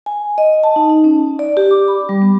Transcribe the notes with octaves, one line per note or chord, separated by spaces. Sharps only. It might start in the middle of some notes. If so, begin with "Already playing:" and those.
G#5
D#5
A5
D#4
D#4
C#4
D5
G4
D6
B5
G3
B3